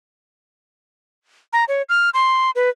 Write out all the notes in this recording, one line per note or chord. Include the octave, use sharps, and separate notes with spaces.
A#5
C#5
F6
C6
B4